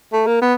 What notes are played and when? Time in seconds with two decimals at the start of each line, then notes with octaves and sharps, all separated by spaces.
0.13 A3
0.27 A#3
0.42 B3